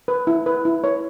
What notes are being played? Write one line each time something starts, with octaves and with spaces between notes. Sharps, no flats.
B4
E4
B4
E4
B4 C#5